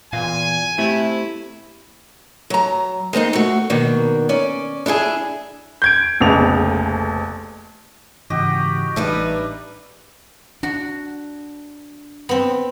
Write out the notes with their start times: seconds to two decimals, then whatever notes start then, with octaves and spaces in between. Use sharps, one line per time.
0.13 E2 A#2 F5 G#5
0.78 A3 C4 E4 G4 C5
2.50 F#3 A#5
3.13 G#3 A#3 C4 D#4
3.33 A3 F#4
3.70 B2 D#3 A#3 D4
4.29 C#4 D5
4.86 D4 E4 F#4 G#4
5.82 G6 G#6 D7
6.20 F1 A#1 F2 C#3 B3 F7
8.30 G#2 C#3 E3 F#4 G4 D#5
8.96 A1 G3 D4 D#4 B4 E5
10.63 D4 F#4
12.29 B3 C4